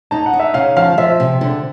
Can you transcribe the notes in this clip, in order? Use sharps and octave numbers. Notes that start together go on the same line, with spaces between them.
D#4 A5
F#5
D#4
E5
C#3 F5
F3 F5
F3 E5
C3
D3